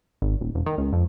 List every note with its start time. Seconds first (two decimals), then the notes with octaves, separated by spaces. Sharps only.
0.22 G#1
0.41 D#1
0.55 E1
0.66 D#3
0.78 C#2
0.93 F2